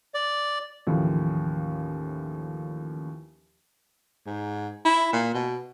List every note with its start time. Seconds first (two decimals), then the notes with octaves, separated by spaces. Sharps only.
0.14 D5
0.87 D#2 A2 C#3 E3 F3
4.26 G#2
4.85 E4
5.13 A#2
5.34 B2